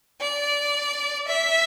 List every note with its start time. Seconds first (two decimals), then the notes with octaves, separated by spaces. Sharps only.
0.21 D5
1.28 E5